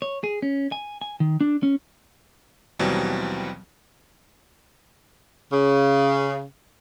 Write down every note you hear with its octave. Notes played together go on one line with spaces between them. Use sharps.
C#5
G#4
C#4
G#5
G#5
D#3
D4
C#4
D#2 B2 E3 F#3 G3 C4
C#3